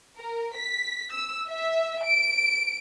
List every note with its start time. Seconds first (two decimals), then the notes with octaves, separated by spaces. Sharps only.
0.18 A#4
0.57 B6
1.13 E6
1.48 E5
2.05 D7